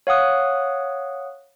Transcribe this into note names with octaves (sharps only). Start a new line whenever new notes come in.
C#5 F5 F#5 D#6 F#6